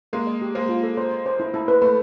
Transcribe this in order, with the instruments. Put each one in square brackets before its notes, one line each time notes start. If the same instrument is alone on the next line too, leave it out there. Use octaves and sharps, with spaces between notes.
[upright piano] G#3 A#3 [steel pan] A#4
[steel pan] D#5
G4
[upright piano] G#3 A#3 [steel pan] C5
[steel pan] F4
A4
C5
C5
C5
E4
E4
B4
[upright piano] A3 [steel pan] B4